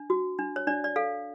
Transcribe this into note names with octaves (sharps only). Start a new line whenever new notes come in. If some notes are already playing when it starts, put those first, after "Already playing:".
Already playing: D4
F#4
D4
C#5
D4 D5
D5
A4 F5